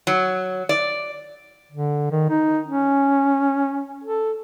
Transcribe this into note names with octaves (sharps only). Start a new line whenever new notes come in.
F#3
D5
D3
D#3
D#4
C#4
A4